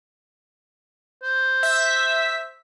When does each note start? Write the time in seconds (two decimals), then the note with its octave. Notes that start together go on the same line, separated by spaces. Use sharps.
1.23 C5
1.63 E5 B6